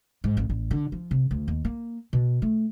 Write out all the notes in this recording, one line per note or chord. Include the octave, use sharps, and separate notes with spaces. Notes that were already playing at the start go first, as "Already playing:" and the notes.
G#2
A1
A1
D3
F3
C3
D2
D#2
A#3
B2
A3